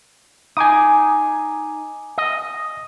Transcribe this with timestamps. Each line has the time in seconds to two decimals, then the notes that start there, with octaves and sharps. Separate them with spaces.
0.57 D#4 G#5 D6 D#6
2.18 D#5